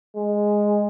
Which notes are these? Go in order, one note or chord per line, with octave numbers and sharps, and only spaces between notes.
G#3